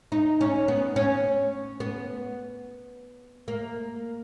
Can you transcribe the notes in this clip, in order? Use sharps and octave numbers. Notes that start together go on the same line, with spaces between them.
D#4
C#4
B3
C#4
B3
A#3